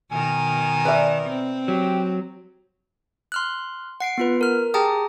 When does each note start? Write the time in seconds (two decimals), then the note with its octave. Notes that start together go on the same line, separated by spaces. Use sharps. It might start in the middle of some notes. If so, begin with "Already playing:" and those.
0.12 B2 D#3 A#4 G#5
0.85 B4 D5 E5
1.29 C4
1.68 F#3 G4
3.32 C6 F6 F#6
4.00 F#5 C7 D7
4.18 B3 F4 B4
4.41 A#4 F6
4.74 G4 G#4 G5 A5 A#5 D#6